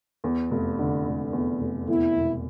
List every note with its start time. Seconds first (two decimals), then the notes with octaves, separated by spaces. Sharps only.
0.24 E2
0.51 F1
0.79 D3
1.06 F1
1.33 E2
1.60 F1
1.88 E2 E4
2.17 E1